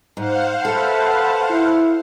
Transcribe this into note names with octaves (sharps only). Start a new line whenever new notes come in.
G#2 C5 F5 F#5
A4 B4 E5 A5
E4